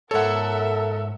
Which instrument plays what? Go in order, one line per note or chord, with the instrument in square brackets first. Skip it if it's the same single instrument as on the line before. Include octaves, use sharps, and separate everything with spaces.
[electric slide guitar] G#2 C#5 [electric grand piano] A4 F#5 [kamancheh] A#4 E5